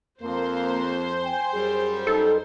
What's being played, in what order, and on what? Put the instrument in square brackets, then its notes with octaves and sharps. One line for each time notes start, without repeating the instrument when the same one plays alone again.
[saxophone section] F2 [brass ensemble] A#3 [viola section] C5
[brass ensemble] G5 G#5
[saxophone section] F#2 G3 [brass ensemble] G#4
[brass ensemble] D#4 [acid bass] A4